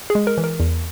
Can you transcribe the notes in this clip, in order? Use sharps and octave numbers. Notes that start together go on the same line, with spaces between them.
G#4
G#3
A#4
E3
A#4
E2